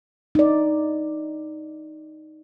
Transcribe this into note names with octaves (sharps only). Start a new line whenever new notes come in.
D#4 D5